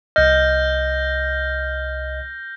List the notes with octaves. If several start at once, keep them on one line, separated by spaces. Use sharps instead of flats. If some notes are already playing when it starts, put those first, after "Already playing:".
C2 D#5 F6 G6 A#6